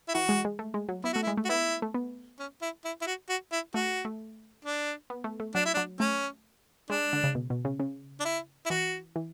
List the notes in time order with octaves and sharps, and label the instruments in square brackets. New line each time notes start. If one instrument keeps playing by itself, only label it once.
[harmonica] E4
[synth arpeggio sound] E3 [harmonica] F#4
[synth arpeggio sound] G#3
G#3
A3
G#3
F#3
[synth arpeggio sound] B3 [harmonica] E4
[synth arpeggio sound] A3 [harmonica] F#4
[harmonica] E4
[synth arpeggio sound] G#3
A3
[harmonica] F#4
[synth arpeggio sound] B3 [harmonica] E4
[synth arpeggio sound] A3
B3
[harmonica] C#4
E4
E4
E4
F#4
F#4
E4
[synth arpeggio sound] A3 [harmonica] F#4
[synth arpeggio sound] A3
[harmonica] D4
[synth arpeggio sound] B3
A3
A3
[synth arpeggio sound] F#3 [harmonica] D4
[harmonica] E4
D4
[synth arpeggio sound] F#3
[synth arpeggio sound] A3 [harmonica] C#4
[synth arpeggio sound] G#3 [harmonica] D4
[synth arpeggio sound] D3
C#3
B2
B2
C#3
C#3
[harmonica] D4
E4
E4
[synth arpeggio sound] E3 [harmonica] F#4
[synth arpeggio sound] E3